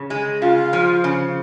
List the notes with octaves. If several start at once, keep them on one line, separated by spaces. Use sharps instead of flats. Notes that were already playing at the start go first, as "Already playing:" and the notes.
Already playing: C#3
G#3
C#3 F4
F3
C#3